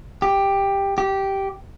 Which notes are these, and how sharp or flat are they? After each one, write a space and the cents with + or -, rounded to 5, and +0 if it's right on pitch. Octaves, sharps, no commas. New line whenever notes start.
G4 +10
G4 -10